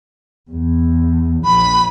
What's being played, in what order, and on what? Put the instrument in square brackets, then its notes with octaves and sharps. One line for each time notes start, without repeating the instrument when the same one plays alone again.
[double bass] E2
[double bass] A#1 [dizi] B5